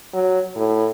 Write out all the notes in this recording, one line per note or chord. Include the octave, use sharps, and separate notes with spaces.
F#3
A2